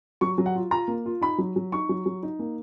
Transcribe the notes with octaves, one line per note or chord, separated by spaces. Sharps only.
F#3 C#6
F#3
F#5
F4
F4 A#5
A#3
F4
D#4 B5
F#3
F#3
D#4 C#6
F#3
F#3
D#4
A#3